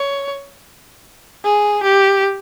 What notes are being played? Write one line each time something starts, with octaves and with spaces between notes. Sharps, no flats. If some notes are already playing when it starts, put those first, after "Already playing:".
Already playing: C#5
G#4
G4